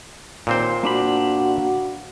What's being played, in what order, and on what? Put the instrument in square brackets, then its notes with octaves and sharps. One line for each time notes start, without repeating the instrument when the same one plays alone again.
[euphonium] D#2 [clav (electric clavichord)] A#2 C4 C5
[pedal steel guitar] A#3 D4 B5 [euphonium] F#4